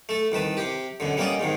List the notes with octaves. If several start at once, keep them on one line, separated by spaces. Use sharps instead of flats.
A3 A4
C2 D#3 B4 A5
C3 G4
F#2 B2 D3
G3 A#3 B3 C#4 D5 D#5
G#2 C3 D#3